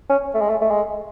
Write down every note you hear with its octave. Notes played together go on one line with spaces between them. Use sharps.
C#4
A3
G#3
A3
A3
G#3